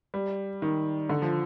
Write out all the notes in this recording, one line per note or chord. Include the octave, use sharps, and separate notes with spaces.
G3
D#3
D3
F3